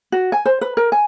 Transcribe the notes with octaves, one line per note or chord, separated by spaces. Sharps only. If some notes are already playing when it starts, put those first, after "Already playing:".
F#4
G#5
C5
B4
A#4
G#5